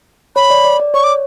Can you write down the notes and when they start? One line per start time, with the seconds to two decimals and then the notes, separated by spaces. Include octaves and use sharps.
0.36 C#5 B5
0.50 D5
0.65 D5
0.80 D5
0.94 C#5 C#6
1.04 D6